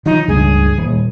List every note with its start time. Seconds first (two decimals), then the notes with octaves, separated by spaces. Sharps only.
0.06 D#3 F3 F#3 D#4
0.28 C#2 G2 G#4
0.78 D#1